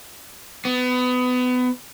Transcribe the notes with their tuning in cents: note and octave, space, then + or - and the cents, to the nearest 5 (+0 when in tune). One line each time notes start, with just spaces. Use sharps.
B3 +25